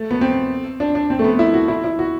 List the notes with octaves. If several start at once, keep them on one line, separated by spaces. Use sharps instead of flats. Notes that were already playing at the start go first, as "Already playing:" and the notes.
Already playing: A3
B3
C4
D4
D4
C4
A3
B3
E4
F#4
E4
E4
F#4